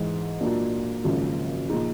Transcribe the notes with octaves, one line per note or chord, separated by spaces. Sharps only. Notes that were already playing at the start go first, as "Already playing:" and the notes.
Already playing: G#2 E3 G#3
A#2 F#3 A#3 D4
G#1 F#2 C#3 F3 A#3
A#2 F3 A#3 D#4 G#4